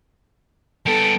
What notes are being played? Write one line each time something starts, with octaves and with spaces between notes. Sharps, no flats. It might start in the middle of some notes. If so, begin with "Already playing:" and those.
G3 B3 A4 D7